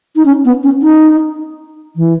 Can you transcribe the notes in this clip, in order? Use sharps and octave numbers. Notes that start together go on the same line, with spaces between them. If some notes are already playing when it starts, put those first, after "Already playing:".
D#4
C#4
B3
C#4
D#4
E3